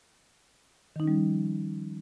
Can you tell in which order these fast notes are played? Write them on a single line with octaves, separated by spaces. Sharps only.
D#3 D#4 C#4 G3 F3